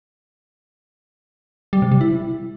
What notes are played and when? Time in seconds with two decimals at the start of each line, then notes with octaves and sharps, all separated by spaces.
1.73 G3
1.82 C3
1.91 G3
2.01 E4